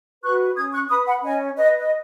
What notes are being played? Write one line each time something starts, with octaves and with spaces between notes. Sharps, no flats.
F#4 B4 C#6 F#6
C#4 D#6 G#6
C#6 F#6
B4 B5 D#6
F#5 B5
C#4 D#5 G#5
B4 D#5
D#5